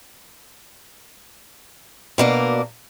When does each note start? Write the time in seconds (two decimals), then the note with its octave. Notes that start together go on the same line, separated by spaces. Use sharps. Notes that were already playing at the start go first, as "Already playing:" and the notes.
2.18 B2 A#3 D4